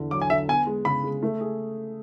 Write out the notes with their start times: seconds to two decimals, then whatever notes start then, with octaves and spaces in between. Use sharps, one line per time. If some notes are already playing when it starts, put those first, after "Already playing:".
Already playing: E2 D3
0.11 F#3 D6
0.21 G#5
0.30 D3 E5
0.49 B3 G#5
0.66 G#3
0.85 C#3 B5
1.04 G#3
1.23 A3
1.40 G#4